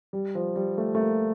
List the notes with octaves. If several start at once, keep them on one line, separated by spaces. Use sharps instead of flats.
G3
F3
G3
A3
A3
A#3